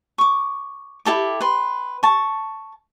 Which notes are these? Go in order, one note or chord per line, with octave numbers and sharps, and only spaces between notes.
C#6 D6
E4 G4 A4 D6
B4 C6
A5 C#6